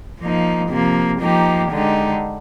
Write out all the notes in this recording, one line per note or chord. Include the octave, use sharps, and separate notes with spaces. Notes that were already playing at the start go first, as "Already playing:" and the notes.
F3 A#3 D#4
C3 F3 A#3
F3 A#3 D#4 G4
D3 G#3 D#4 G4